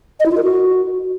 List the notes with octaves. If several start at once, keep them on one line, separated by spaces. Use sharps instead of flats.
D#5
E4
F4
A#4
F#4